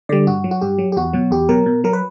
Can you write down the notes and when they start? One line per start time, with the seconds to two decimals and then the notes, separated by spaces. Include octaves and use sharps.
0.09 D3 G3 D5
0.27 G2 F#4
0.44 F#3
0.51 F#4
0.61 G2 G4
0.78 F#3
0.92 G4
0.96 E2 F#4
1.13 B2 F#3
1.31 E2 G4
1.49 B2 F#3 A#4
1.66 B2
1.84 F#3 A#4
1.93 B4